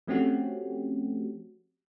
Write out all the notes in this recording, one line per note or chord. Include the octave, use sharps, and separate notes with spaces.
F3 A3 C4 C#4 F#4 G4